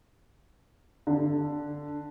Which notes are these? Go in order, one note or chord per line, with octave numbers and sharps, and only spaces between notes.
D3